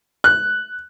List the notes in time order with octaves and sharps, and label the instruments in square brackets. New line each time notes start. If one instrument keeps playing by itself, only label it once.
[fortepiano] F#6